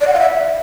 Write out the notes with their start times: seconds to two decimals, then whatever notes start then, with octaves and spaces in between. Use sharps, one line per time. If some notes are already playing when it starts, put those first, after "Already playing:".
0.01 D5
0.07 F#5
0.13 F5
0.20 E5